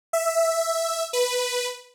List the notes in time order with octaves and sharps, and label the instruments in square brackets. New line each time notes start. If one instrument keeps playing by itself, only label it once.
[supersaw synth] E5
B4